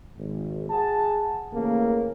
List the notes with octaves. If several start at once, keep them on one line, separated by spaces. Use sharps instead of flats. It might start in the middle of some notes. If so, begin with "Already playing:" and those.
G#1
G#4 F#5 A5
C#3 E3 A3 A#3